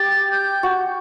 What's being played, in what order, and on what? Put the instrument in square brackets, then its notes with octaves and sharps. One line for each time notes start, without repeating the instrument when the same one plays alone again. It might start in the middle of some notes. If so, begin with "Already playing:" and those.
Already playing: [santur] G4 [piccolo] A6
[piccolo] G6
[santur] F#4